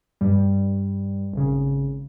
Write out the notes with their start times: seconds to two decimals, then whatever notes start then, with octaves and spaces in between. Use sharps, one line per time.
0.21 G2 G3
1.33 G#1 C#3